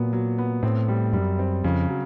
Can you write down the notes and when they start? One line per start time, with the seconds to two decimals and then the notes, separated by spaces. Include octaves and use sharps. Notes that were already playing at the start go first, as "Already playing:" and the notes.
Already playing: A#2 F#3 B3
0.13 F#3
0.38 B3
0.63 A2 C4
0.88 G3
1.13 F#2 G3
1.39 C4
1.64 F2 C#3
1.89 F#3